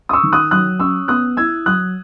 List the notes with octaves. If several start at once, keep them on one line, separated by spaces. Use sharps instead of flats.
D#6
C#6 E6
D#3
D#6 F#6
F#3 D#6 F#6
C#4 C#6 E6
B3 D#6 F#6
E4 E6 G#6
F#3 D#6 F#6